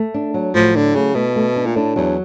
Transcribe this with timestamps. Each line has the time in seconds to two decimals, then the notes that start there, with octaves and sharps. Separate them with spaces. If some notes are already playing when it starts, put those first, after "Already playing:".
Already playing: A3
0.14 D4
0.34 F#3
0.54 A2 F3
0.75 D3 F#3
0.95 C#3 A3
1.15 B2 A3
1.36 A3
1.56 D4
1.66 A#2
1.76 A2 D4
1.96 E2 F#3